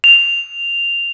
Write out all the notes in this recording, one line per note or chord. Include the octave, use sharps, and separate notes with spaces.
F7